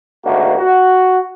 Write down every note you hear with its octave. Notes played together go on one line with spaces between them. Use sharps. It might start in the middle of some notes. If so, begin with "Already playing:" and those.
G#1 D2 A#3 F#4
F#4